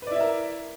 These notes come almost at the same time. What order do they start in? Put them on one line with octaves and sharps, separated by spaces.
B4 D5 E4 E5 A#4